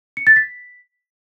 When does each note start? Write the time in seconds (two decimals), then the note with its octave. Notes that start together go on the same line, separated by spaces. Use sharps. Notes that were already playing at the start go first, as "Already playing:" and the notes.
0.17 C#7
0.27 A6
0.36 B6